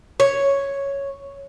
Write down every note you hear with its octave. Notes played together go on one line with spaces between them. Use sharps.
C#5